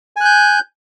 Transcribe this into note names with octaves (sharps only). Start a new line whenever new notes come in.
G#5 F#6 G6